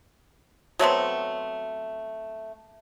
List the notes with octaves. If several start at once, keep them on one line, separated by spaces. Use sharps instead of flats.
F#3 A3 B3 C4